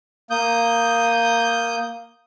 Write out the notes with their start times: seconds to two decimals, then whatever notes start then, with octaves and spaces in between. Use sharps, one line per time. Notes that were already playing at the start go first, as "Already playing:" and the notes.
0.30 A#3 D#6 G6